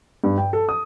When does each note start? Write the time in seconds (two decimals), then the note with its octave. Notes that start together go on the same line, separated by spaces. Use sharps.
0.24 G2
0.38 G5
0.53 A4
0.69 D#6